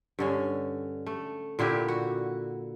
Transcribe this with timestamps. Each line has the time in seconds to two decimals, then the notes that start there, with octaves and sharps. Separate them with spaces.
0.19 G2 D3 C#4
1.07 A3
1.59 A#2 D3 E4 G4
1.89 F#4